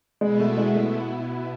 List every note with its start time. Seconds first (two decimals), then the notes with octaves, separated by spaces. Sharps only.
0.21 B2 G#3 B3 E4
0.40 A3
0.57 G#3
0.75 A3